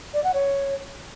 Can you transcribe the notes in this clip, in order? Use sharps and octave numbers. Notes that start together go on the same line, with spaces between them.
D5
F#5
C#5